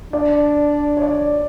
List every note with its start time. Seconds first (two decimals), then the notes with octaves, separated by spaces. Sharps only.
0.13 D4 D5
0.97 C#5
1.02 D5